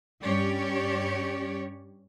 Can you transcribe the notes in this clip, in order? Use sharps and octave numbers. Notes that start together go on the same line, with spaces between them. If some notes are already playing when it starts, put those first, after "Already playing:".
G2 G3 C#4 G4 C#5 D5